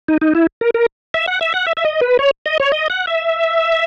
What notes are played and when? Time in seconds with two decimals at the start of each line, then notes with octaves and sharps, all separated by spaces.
0.08 D#4
0.21 D#4
0.35 E4
0.61 A#4
0.74 A#4
1.14 E5
1.27 F#5
1.41 E5
1.54 F#5
1.67 E5
1.77 E5
1.85 D#5
2.01 B4
2.19 C#5
2.46 D#5
2.60 C#5
2.72 D#5
2.90 F#5
3.07 E5